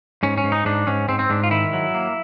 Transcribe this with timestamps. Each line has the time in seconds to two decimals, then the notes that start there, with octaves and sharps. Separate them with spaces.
0.23 G#2 C#4
0.38 C#4
0.44 G#2
0.52 D#4
0.65 G#2 D4
0.87 G#2 C#4
1.08 G#2 C4
1.19 C4
1.30 G#2 D4
1.44 F4
1.51 D#3 E4
1.73 F#3
1.94 A#3